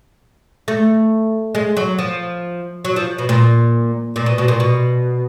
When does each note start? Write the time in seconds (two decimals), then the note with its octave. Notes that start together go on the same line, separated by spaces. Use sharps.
0.68 A3
1.55 G#3
1.77 F#3
1.99 F3
2.85 F#3
2.96 F3
3.18 B2
3.29 A#2
4.16 A#2
4.26 B2
4.38 B2
4.48 A#2
4.60 B2